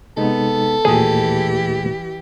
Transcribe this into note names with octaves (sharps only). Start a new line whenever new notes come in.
C3 G#3 B3 D#4 A4
D#2 A#2 E3 A3 G4 G#4